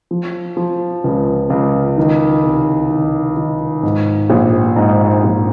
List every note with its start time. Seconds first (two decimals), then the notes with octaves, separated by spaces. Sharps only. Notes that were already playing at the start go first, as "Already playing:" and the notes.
0.11 F3
0.57 F3
1.04 C#2
1.50 C#2
1.98 D#3
2.44 C2
2.90 D#3
3.37 D#3
3.83 G#2
4.30 A#1
4.76 G#2
5.24 A#1